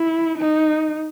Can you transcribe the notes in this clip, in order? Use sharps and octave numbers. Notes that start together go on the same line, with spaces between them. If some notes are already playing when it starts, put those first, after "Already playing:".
Already playing: E4
D#4